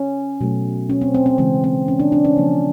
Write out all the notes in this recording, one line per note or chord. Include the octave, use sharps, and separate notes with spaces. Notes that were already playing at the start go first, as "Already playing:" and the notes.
Already playing: C#4
B2 F#3 A3
C#4
C4
C4
C4
C#3 E3 G#3 C4
C4
C#4
D4
D4
C#4
C#3 F3 A#3